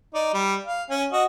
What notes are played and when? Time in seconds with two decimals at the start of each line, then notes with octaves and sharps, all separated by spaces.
0.14 D#4 D5
0.34 G3
0.65 F5
0.90 C#4
1.12 F#4 D#5